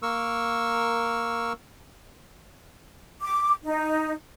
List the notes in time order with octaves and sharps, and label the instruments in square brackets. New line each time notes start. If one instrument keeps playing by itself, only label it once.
[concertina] A#3 A#4 C#6 E6
[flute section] D6
D#4